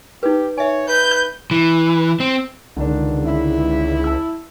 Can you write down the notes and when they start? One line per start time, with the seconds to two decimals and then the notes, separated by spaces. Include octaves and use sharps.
0.23 D#4 G4 B4
0.58 C#5 E5 G#5
0.89 B4 G6
1.51 E3
2.20 C4
2.77 C#2 D3 D#3 D4
3.26 E4
4.04 A5 E6